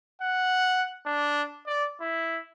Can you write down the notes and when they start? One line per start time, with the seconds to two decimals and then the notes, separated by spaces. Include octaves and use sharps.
0.22 F#5
1.06 D4
1.67 D5
2.01 E4